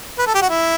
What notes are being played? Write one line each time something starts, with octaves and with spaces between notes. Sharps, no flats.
B4
A4
G4
F#4
E4